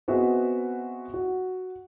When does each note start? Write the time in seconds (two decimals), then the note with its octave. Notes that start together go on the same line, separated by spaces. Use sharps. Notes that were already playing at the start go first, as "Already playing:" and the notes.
0.08 B3 C4 F#4 G#4 D#5 E5
1.14 F#4